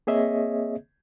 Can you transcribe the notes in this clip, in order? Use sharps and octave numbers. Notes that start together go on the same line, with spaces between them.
A#3 C4 G#4 C#5 D#5 E5